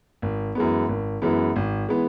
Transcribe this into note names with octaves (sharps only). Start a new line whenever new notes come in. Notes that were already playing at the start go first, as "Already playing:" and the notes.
G#1
F#2 E3 G#3 B3
G#1
F#2 E3 G#3 B3
G#1
E3 G#3 B3